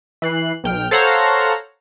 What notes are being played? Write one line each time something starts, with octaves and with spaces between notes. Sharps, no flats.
E3 F#6 C7
B1 G5 F6
A4 C5 C#5 F5 F#5 A#5